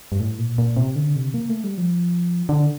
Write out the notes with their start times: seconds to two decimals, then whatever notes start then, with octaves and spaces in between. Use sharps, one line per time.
0.12 G2
0.20 A2
0.38 A#2
0.58 A#2
0.77 C3
0.96 D3
1.16 C3
1.34 A#3
1.49 A3
1.64 G3
1.78 F3
2.49 D3